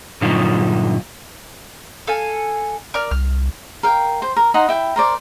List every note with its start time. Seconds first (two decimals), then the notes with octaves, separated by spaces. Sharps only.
0.21 G2 A#2 D3 F#3 D#4 F4
2.07 A4 F5 G#5
2.94 A#4 D5 F6
3.11 C2 F6
3.83 A#4 F5 G5
4.22 C5
4.36 A#4
4.54 D#4 F#5 A#5 C6
4.69 E4 G5
4.96 A#4 C5 D5